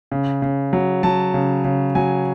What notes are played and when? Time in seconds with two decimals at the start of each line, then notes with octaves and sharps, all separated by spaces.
0.12 C#3
0.42 C#3
0.73 F#3
1.03 F#3 A5
1.34 C#3
1.64 C#3
1.95 F#3 G#5